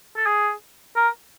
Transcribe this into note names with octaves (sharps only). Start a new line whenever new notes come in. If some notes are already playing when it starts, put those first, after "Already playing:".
A4
G#4
A#4